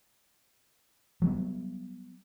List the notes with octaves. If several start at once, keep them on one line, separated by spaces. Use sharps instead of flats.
F#3 G3 B3